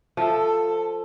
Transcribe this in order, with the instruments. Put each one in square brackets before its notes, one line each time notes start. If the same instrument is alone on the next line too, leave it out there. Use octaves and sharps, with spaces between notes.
[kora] F3 [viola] A4